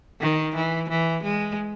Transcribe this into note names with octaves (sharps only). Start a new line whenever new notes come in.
D#3
E3
E3
G#3